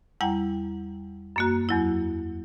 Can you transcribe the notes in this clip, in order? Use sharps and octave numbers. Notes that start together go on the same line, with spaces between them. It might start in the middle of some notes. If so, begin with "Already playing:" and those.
E2 G3 E4 F#5 G5 A#5
F#2 A#3 F#4
E2 F#3 E4